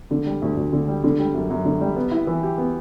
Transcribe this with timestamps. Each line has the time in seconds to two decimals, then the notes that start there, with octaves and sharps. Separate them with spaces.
0.11 D3
0.26 G3
0.42 D2
0.57 D2
0.73 D3
0.88 G3
1.04 D3
1.19 G3
1.34 F#2
1.50 F#2
1.65 D3
1.81 G3
1.96 B3
2.11 E4
2.27 E3
2.43 G4
2.58 B3